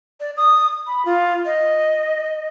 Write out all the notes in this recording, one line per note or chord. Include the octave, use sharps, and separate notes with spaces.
D5
D#6
B5
F4
D#5